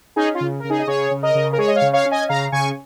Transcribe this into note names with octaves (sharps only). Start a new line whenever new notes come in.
C#4 D#4 G#4
F4
C#3
C#3 A#4
D#4 G#4
D#5
C#3 G#4 C#5
C#3
A#4 D#5
C#3
A#4
G#3 G#4 C#5
D#5
C#5 F5
C#3
C#5 F5
C#4
D#5 G#5
C#3 F5 A#5
C#3 G#5 C#6